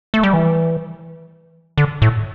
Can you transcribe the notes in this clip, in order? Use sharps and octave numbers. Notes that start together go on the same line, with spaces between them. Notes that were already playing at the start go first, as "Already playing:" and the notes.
A3
G3
E3
D3
A2